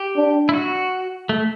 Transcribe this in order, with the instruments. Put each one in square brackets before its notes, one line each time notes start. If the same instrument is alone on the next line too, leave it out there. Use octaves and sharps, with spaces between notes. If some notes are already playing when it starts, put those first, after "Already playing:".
Already playing: [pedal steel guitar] G4
[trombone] D4
[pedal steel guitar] E4
F#4
A3